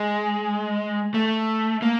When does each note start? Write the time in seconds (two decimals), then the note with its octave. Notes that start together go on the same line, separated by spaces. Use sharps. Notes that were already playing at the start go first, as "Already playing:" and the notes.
Already playing: G#3
1.14 A3
1.82 A#3